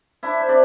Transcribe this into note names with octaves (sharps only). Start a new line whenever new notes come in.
D4 E4 E5
C5
C3 D4 D5